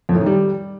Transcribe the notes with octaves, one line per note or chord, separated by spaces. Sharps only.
F2
A2
D#3
G3